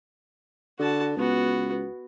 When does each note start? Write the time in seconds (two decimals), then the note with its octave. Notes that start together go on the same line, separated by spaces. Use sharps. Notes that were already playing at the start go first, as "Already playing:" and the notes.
0.79 D3 F#4 A5
1.17 C#2 B3 F#4